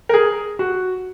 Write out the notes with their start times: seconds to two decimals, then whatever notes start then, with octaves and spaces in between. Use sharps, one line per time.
0.09 A#4
0.14 G#4
0.59 F#4